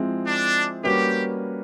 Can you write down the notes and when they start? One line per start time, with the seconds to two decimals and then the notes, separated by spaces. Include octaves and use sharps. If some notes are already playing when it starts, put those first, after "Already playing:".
Already playing: F3 G#3 C4 E4
0.27 D4
0.84 G3 A#3 C#4 F#4 G4 B4